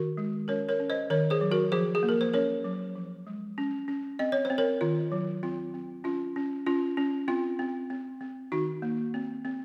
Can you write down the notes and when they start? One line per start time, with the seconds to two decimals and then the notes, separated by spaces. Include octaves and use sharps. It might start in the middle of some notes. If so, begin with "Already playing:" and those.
Already playing: D#3 F#4 A#4
0.17 G#3
0.48 C#4 A#4 C#5
0.69 A#4 C#5
0.80 C#4
0.90 C5 D#5
1.10 D#3 A#4 C#5
1.30 G#4 C5
1.41 F#3
1.51 F#4 A#4
1.72 F3 G#4 C5
1.95 G#4
2.03 A#3
2.09 A#4
2.21 C5
2.33 C#4 A#4 C#5
2.64 F#3
2.95 F3
3.27 G#3
3.58 C#4
3.88 C#4
4.19 C4 D#5
4.32 C#5
4.45 C5
4.50 C4
4.58 A#4 C#5
4.81 D#3 F4
5.12 F#3
5.43 C4 F4
5.74 C4
6.04 C#4 F4
6.36 C#4
6.66 C#4 F4
6.97 C#4
7.28 C4 F4
7.59 C4
7.90 C4
8.21 C4
8.52 D#3 D#4 F#4
8.82 A#3
9.14 C4
9.45 C4